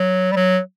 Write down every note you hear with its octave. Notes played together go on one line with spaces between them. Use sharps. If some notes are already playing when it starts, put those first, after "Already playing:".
Already playing: F#3
G3
F#3